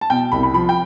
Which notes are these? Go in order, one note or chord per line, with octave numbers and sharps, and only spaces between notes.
A5
B2 G5
C2 B5
B5
F3 B5
G5